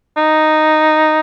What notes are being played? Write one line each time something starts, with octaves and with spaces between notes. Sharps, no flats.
D#4